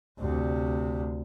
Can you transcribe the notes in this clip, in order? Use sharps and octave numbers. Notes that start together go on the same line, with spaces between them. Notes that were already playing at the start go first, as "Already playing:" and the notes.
D2 C3